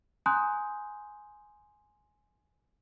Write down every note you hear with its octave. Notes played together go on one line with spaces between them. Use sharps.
G#5 A#5 C6 D#6 F#6 G6